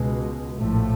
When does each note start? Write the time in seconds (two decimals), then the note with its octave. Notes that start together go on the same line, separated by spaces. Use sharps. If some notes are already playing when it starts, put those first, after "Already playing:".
Already playing: C#2 B2 G#3
0.55 A#1 A2 F3 A3